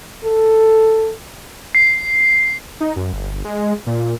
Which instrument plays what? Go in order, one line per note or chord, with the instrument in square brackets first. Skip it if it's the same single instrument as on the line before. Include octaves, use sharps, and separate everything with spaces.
[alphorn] A4
[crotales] C7
[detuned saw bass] D#4
F#2
G1
G#3
A#2